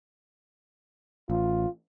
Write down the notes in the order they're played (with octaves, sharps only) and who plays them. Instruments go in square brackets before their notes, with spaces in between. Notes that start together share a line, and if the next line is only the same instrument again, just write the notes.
[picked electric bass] A1 [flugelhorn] F4